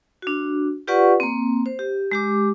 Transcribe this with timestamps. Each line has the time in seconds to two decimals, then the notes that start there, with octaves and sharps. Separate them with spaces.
0.22 D4 F#4
0.87 F4 G4 B4 D5 F#5 C#6
1.20 A#3 C4
1.66 C5
1.79 G4
2.12 G#3 G4 D6